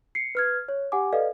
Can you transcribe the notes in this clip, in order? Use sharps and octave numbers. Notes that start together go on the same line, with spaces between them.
C7 C#7
B4 F6 G#6
C#5
G4 F#5 G#5 D6
A4 B4 D5 D#5 F5